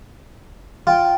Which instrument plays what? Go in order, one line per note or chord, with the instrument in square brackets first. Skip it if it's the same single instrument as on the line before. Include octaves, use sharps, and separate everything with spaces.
[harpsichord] F4 [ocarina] G5